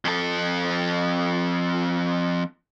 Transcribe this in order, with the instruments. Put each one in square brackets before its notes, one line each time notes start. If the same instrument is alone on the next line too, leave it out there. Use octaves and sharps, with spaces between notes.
[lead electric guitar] F2 A4